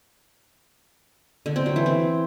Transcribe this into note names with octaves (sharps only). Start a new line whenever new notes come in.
D3
C4
F#3
E3
C4